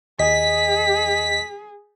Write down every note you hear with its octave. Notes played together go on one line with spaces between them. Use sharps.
D#2 G#4 D#5 B6